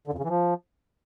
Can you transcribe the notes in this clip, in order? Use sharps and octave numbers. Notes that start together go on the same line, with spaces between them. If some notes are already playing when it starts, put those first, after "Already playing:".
D3
F2
C#3
E3
F3